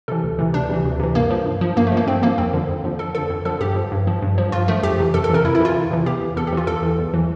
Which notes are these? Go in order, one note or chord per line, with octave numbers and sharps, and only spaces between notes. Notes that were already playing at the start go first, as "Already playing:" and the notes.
C3 E3 A4
D2
C3 E3
D2 D4
C3 E3
D2
C3 E3
G2 A#3
F3
G2
F3
G2 A#3
A3
F3
A#3
G2 C4
F3 A#3
F2 C4
D3 F3
F2
D3 F3
F2 A4
D3 F3 A4
F2
D3 F3 A4
G2 G4
F3
G2
F3
G2
F3
G2 F4
F3 A3
F2 G4
C3 E3
F2 A4
A4
C3 E3 A#4
F2 E4
E4
C3 E3 F4
F2
C3 E3
E2 G4
E3
E2 A4
G4
E3 F4
E2 A4
E3
E2
E3